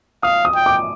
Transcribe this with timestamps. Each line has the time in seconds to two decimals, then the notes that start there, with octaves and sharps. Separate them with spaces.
0.23 F5 D#6
0.45 D#6
0.55 G5
0.66 D6